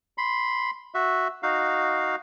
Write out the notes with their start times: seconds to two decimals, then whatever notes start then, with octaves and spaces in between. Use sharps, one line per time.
0.18 B5 C6
0.94 F#4 E5
1.43 D#4 F#4 F5